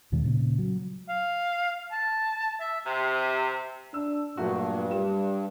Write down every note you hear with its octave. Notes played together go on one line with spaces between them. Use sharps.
D#2 B2 D#3 G#3
A#2 C#3
F#3
F5
A5
E5
C3
D4 E6
G2 A#2 F#3 A3 F#4
G3 E7